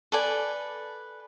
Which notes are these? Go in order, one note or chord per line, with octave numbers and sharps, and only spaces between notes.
A4 B4 D5 G#5